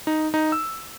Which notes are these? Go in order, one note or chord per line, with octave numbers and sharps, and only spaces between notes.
D#4
D#4
E6